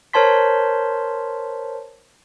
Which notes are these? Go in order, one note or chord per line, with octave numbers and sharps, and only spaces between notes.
A#4 C5 C#5 A5 C6 B6